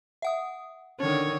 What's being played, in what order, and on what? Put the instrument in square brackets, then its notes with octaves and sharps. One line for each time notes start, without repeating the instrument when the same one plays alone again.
[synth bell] E5 F#5 D#6
[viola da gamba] D3 D#3 C#5 [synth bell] C#4